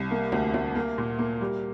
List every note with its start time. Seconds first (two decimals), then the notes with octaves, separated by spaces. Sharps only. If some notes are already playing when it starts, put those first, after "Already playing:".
Already playing: C2
0.11 A#3
0.32 D2
0.54 D2
0.75 A#3
0.98 A#2
1.18 A#3
1.41 G3